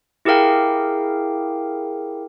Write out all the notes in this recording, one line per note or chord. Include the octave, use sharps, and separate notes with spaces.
E4 G4 G#4 A#4 F5 G5